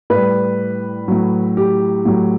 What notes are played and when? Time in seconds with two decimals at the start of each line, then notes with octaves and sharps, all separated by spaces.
0.10 A2 G3 B4
1.08 A2 F#3
1.57 G4
2.05 A2 F#3